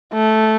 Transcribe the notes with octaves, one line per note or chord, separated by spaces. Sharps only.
A3